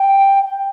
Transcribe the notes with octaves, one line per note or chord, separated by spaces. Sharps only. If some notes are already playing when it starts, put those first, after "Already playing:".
Already playing: G5